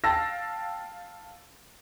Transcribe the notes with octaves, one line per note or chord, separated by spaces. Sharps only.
F5 G5 A5 E6 A6 A#6